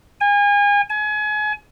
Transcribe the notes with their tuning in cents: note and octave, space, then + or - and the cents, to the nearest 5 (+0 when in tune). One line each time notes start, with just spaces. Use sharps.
G#5 -35
G#5 +30